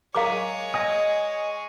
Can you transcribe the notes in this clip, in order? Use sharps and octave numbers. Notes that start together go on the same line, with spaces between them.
G#3 G#4 A#4 C#5 F5 A#5 D6
D#5 G#5 D#6